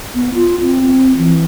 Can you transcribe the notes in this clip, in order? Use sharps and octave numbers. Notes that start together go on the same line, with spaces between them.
B3
F4
C4
E3